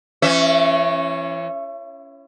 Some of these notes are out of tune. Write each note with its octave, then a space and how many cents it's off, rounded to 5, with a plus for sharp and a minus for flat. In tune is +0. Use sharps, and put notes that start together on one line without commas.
E3 +40 C#4 -10 E5 +0